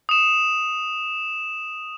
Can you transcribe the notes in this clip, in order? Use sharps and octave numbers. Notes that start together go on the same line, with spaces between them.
D#6 E7